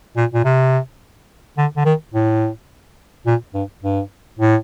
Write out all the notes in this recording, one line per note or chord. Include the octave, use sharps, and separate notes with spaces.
A#2
A#2
C3
D3
D3
D#3
A2
A#2
G2
G2
A2